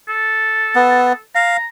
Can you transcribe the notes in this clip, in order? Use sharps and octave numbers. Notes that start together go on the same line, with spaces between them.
A4
B3
F5 A#5